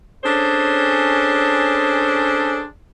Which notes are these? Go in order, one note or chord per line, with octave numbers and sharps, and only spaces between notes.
C#4 D4 G#4 A4 C5 C#5